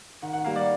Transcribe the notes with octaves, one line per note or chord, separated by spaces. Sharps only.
D#3 F#5
F#5
G3 A#3 F5
D5